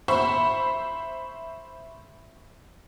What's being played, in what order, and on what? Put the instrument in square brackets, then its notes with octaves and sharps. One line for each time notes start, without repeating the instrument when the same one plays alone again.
[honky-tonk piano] C5 E5 B5 C#6